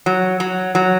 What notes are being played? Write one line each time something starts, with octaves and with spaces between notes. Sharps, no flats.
F#3
F#3
F#3